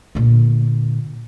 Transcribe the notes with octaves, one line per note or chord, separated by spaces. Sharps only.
A#2 D3